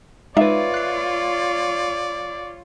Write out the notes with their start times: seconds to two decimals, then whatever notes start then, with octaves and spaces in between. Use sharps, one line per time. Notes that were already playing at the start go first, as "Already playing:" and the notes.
0.37 G#3 D#4 F4 B4 C#5 D5 E5 F5
0.74 F#6 C7